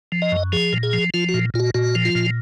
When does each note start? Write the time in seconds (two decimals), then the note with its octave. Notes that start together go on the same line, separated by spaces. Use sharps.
0.12 F3
0.22 D#5
0.32 F#2
0.52 F3 G#4
0.73 A#2
0.83 G#4
0.93 F3
1.14 F3 F4
1.29 F#4
1.34 A#2
1.54 A#2 F4
1.60 F#4
1.74 A#2 F#4
1.95 F3
2.05 F4
2.15 A#2